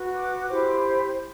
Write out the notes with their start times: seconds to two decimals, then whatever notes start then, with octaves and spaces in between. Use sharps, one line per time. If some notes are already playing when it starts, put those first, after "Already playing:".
Already playing: F#4 B4
0.16 D6
0.47 E4 G4 C5